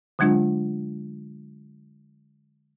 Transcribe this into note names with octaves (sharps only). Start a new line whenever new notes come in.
D3 F#3 G#3 D4 F4